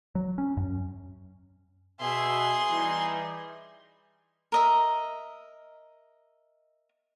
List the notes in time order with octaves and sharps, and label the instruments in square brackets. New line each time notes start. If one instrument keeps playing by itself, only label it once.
[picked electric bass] F#3
C#4
F#2
[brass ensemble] B2 E5 [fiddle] G#4 C6
[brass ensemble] E3 G3 D#4
[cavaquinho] A#4 D#5 E5